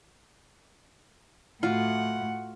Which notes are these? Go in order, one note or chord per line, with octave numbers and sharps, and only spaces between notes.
A2 F4 F#4 F#5